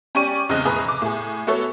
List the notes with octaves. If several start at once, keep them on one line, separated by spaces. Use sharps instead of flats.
C#4 G4 D5 C#6 D#7
E2 C#3 C4 D#5 F#6
F1 A2 G#4 B4 A#5 D#6
D6
A2 G#4
A3 B3 F#4 A4 C#5